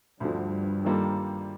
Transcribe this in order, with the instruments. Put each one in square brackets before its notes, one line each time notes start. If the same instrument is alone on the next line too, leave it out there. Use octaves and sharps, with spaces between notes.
[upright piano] D2 D3 F3 [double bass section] G2
[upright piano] D#3 G3 A#3 F4 A4